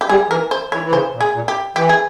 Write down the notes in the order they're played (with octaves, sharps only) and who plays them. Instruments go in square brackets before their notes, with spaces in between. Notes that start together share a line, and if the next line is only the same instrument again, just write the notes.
[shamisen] G4
[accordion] G3 [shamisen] G#4
[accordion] E3 [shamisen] A#4
[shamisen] C5
[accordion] E3 [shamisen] C#5
[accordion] E3
[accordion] C#3 [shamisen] C5
[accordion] A#2
[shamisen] G#4
[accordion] A#2
[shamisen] G4
[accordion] E3 [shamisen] G4
[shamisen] G#4